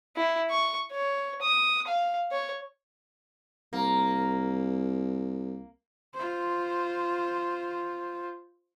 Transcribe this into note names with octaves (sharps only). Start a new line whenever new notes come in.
E4
C#6
C#5
D#6
F5
C#5
C2 A#3
F4 C5